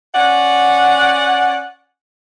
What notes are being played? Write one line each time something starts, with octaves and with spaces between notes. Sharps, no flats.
C#4 D5 F#5